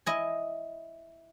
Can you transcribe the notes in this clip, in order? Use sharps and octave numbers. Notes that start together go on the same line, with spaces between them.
E4 D#5 G#5